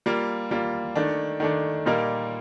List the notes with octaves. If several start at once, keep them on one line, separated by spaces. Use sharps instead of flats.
G3 A#3 F4
G3 A#3 F4
D#3 A3 D4
D#3 A3 D4
A#2 G3 A#3 D#4 A#4